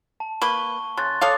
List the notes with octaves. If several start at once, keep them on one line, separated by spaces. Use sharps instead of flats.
A5
A#3 B4 C#6 G7
C#3 C6 F#6 A6
A4 C#5 F5 D6 D#6 A6